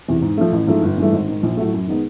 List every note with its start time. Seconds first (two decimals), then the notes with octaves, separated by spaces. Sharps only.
0.08 E2 C3 E3
0.22 G#2
0.37 F3 A3
0.52 A1
0.67 G#2 F3 A3
0.82 G1
0.97 G2 E3 A3
1.12 G#1
1.28 G#2 D#3
1.43 A#1
1.57 A2 F#3 A3
1.73 F#2
1.87 D#3 G#3 B3 D#4